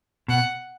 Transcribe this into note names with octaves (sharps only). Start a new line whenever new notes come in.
B2 F#5